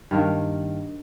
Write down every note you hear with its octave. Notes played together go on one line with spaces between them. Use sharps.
G2 D#3 A#3